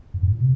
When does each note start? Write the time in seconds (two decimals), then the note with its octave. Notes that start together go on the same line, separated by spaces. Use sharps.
0.14 F#2
0.23 G#2
0.32 A#2
0.40 C3